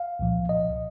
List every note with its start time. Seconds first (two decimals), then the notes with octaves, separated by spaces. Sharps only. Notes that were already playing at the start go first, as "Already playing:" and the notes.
Already playing: F5
0.19 C2 A#2 F3
0.49 D#5